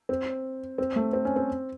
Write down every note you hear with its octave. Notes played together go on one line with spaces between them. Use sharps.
C4
C4
A3
C4
C#4
C4